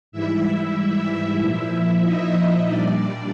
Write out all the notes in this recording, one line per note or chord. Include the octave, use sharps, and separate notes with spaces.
G#2 E3 G3 E4 E5
E4 E5
A#2 F3
D#4 D#5
A#2 G3 D4 D5